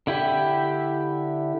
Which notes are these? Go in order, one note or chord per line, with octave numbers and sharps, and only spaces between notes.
D3 E4 G4